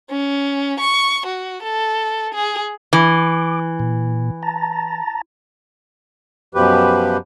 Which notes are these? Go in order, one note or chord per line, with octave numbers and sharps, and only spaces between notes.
C#4
C#6
F#4
A4
G#4
E3 D6
A#2
A5 A#5
F#2 B2 F3 G4 B4